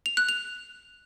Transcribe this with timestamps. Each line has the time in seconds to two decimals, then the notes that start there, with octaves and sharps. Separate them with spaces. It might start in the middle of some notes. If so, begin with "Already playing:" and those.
0.06 F7
0.17 F#6
0.29 F7